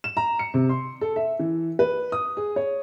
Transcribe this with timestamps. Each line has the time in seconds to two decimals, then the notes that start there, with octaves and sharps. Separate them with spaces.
0.04 E7
0.17 A#5
0.39 C#7
0.54 C3
0.69 C6
1.01 A4
1.16 E5
1.39 E3
1.79 B4
2.12 D#6
2.37 G#4
2.56 C#5